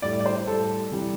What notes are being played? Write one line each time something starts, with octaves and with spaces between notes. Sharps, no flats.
A2 G3 D5
D5
C5
A2 G3 A4
C3 E3 G3